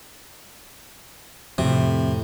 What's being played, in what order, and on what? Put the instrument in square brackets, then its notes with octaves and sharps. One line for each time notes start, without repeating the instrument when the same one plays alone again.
[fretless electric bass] F2 [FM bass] A2 [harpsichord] C3